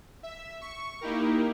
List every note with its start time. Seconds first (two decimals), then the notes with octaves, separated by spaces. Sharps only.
0.23 E5
0.61 C#6
1.01 A#3 D#4 E4 G4 A#4